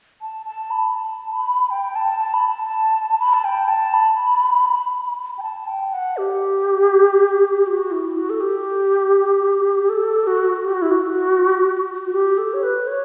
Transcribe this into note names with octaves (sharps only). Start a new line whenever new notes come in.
A5
A5
B5
A5
B5
G5
A5
A5
B5
A5
B5
A5
G5
A5
B5
G5
A5
G5
F#5
G4
F#4
E4
F#4
A4
G4
A4
F#4
G4
F#4
E4
F#4
F#4
G4
A4
C#5
B4
C#5